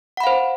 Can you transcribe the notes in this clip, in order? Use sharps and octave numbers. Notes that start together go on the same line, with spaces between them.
C5 F5 F#5 B5